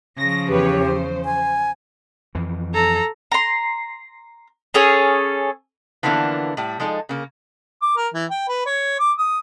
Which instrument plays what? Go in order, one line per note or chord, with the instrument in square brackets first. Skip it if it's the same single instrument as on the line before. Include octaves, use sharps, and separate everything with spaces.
[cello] C#3 F3 [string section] A#6
[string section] E2 B4 C#5 [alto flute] G4
[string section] C5
[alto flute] G#5
[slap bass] F2 E3
[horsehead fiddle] A4 A#5
[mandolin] A#5 C6
C#4 G#4 A4 C#5
[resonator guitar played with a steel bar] D3 E3 F3 A#3 B3 D4
A2 G3
F3 G#3 D#4 A4
C#3 A#3
[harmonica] D6
A#4
E3
G5
B4
C#5
D6
D#6